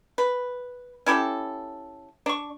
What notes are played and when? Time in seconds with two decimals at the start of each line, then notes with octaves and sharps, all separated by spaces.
0.18 B4
1.06 C#4 E4 G4 A4
2.26 D4 C#6